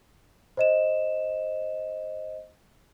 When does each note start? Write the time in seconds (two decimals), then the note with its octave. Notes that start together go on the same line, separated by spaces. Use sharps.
0.57 C5 D#5 E7